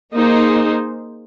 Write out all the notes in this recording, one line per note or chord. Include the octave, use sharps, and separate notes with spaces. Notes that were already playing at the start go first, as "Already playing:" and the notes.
A#3 D#4 G#4 C5